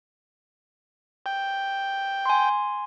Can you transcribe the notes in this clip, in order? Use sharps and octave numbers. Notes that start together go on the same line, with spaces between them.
G5
G#5 C6